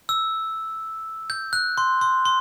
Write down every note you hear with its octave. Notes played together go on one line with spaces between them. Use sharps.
E6
G6
F#6
C6
C6
C6